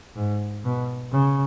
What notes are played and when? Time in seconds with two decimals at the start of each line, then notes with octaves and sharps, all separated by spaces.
0.16 G#2
0.64 B2
1.11 C#3